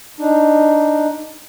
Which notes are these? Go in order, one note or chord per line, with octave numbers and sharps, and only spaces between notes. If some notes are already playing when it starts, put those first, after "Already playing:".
D4 D#4